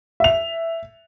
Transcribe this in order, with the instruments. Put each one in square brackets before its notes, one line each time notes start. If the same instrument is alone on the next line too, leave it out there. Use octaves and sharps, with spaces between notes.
[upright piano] E5 F7